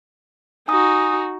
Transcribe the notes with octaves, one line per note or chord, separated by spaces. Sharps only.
D#4 F#4 G#5 D#6